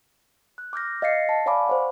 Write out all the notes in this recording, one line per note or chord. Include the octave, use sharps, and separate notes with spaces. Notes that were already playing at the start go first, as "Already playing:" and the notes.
F#6
D6 F6 G6 A#6
D#5 F5 A6 A#6 C7 C#7
A5
C#5 D5 F5 G#5 B5 D6
C5 C#5 F#5